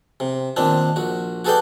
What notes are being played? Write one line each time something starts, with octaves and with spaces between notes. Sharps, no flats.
C3
A#2 D#3 C4 D4
A#1 F#4
F#4 G#4 A4 B4 D5 G5